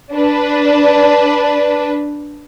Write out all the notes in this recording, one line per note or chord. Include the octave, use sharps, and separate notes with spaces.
D4 B4